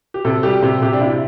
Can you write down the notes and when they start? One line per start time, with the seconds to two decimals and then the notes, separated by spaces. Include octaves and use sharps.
0.14 G4
0.25 C3 A4
0.43 G3 G4
0.62 C3 G4
0.82 C3 G4
0.93 D4
1.01 C3 E4